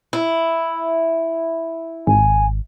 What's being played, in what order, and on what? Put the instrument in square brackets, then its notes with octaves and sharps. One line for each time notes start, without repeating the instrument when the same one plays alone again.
[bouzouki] E4
[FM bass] G#1 [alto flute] G#5